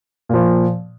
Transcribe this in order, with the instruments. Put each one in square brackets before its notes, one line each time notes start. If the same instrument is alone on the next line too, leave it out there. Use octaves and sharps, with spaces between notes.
[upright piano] A#2 F3